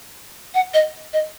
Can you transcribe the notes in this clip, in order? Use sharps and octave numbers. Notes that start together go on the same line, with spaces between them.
F#5
D#5
D#5